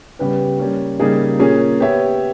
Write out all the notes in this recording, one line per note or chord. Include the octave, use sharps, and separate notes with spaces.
C#3 G3 B3 G4 B4
G3 A#3 C#4
C#3 G3 A#3 D#4 G#4
A#2 A#3 C#4 G#4
B3 G4 C#5 E5